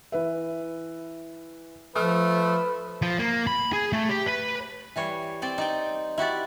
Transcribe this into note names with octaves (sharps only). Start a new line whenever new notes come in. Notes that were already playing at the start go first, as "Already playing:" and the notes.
E3 B4 E5
F3 A3 B4 D#6 F6 F#6
F3
A#3
B5
G#4
A3
G4
B4
E3 G3 C#5
C4 D5 G5
D#4 D5 G5
E4 F#4 G4 D5